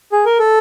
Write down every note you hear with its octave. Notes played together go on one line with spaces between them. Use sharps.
G#4
A#4
A4